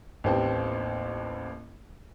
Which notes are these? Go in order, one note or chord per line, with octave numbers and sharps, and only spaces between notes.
A1 D#2 B3 C4 G4 A5